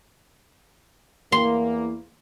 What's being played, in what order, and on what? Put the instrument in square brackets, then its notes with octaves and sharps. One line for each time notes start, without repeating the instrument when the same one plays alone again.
[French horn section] E2 A#3 [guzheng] C6